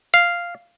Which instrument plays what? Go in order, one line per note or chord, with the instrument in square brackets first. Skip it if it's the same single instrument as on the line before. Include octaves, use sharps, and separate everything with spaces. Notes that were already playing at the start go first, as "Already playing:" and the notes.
[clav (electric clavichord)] F5